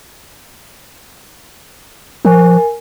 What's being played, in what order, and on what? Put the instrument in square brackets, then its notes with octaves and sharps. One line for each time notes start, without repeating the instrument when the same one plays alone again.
[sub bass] F3 [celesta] A#4 G#5